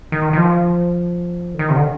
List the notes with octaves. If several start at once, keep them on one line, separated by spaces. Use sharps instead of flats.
D#3
D#3
F3
D3
D#3
C3
D3